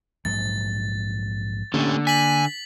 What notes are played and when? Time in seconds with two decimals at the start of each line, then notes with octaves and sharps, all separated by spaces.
0.25 A#1 G#2 F#3 A6
1.74 D3 A3 A#3 C#4 G4
2.07 G#5 B6 F#7